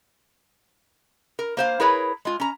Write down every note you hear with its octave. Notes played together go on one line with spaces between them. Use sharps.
A#4
A#3 C5 F5
E4 G#4 A#4 B4 C#5
G#3 F4
C#4 A#5